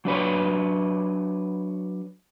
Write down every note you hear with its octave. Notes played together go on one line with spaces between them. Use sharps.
F#3 D4 B4 C#5